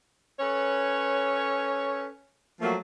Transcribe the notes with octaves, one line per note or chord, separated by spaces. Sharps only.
C#4 A4 B4 C#5
F3 F#3 A3 A#3